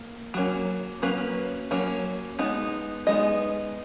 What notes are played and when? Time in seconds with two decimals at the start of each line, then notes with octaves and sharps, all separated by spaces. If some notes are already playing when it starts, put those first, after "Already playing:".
Already playing: A#3
0.34 F#3 A#3 C#4
1.02 F#3 A#3 C#4 B4
1.71 F#3 A#3 C#4
2.39 G#3 B3 D#4
3.07 G#3 B3 D#4 D#5